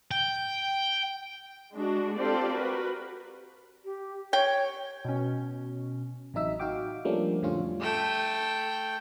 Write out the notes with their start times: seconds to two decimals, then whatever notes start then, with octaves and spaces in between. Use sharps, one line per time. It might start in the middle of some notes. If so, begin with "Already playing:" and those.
0.11 G5
1.74 G#3 D4 F#4
2.16 C4 F4 G4 A4 C5 D5
2.51 F#4 A#4 B4
3.85 G4
4.33 C#5 G5
5.05 B2 C#4
6.34 A1 C3 F#3 D#4 E5 E6
6.60 D#4 F#4 F5 G5 D6
7.05 F3 G3 A3 A#3 C#4 D4
7.42 F2 A2 D3 G3 C#4 F4
7.80 A3 G5